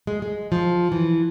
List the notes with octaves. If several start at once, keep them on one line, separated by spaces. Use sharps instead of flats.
G#3
G#3
F3
E3